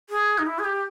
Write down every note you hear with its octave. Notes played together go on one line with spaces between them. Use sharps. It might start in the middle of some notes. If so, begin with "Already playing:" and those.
G#4
D#4
E4
G#4
G4